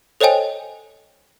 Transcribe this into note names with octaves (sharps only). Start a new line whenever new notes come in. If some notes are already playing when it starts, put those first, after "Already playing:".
A4 C5 C#5 D#5 G5 G#5